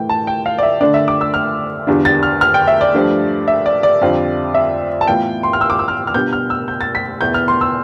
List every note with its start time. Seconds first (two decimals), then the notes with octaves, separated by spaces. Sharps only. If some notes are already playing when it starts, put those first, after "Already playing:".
Already playing: A2 E3 A3 G5
0.09 A5
0.27 G5
0.46 F5
0.58 D5
0.63 E5
0.81 D3 A3 D4 D5
0.94 E5
1.08 D6
1.21 E6
1.34 F6
1.87 E2 D3 G3 D4 F4
2.05 A6
2.23 F6
2.41 F6
2.54 G5
2.68 E5
2.81 D5
2.94 G2 F3 A3 D4
3.48 E5
3.66 D5
3.83 D5
4.01 F2 D3 G3 C4 F4
4.54 E5
5.01 A5
5.07 A2 E3 B3 F4 G5
5.43 C6
5.53 F6
5.61 E6
5.70 D6
5.79 E6
5.88 F6
6.07 F6
6.14 B2 G3 D4 F4 G6
6.33 F6
6.50 E6
6.68 G6
6.81 A6
6.95 B6
7.21 E2 B2 B3 E4 G6
7.34 F6
7.48 C6
7.61 E6